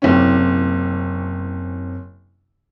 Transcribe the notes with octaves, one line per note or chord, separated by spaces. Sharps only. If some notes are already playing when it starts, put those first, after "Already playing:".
F#1 C3 C#4